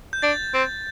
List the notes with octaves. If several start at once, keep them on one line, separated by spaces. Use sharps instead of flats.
G6
D4 A6
C4